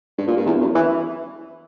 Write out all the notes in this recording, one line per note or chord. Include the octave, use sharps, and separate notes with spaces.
G2
A#2
G2
E2
F#2
E3